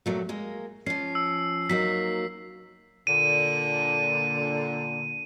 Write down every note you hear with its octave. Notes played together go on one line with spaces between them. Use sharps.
A#2 F#3 A3
G#3 A#3
F3 C#4 C7
E6
F#3 A#3 D#4 B6
A#2 D3 D#7